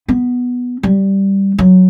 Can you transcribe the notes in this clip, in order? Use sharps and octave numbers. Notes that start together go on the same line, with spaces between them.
B3
G3
F#3